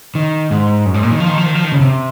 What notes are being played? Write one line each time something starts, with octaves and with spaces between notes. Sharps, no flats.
D#3
G#2
F#2
G#2
A#2
D#3
F3
D#3
F3
D#3
F3
D#3
C#3
C3